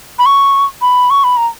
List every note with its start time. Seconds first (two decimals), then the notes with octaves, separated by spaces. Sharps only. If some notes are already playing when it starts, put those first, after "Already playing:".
0.19 B5
0.26 C#6
0.81 B5
1.10 C#6
1.24 B5
1.37 A#5